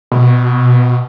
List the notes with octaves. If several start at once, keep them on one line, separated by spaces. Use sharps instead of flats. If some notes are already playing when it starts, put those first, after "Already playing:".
B2